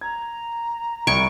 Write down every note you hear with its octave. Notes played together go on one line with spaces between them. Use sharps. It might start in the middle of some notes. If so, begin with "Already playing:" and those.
A#5 G#6
C2 C#6 G#6 D7